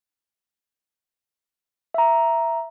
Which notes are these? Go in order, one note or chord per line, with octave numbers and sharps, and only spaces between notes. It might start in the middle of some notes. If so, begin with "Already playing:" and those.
E5 A#5